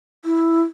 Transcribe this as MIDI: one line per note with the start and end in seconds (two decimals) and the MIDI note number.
0.25 0.61 64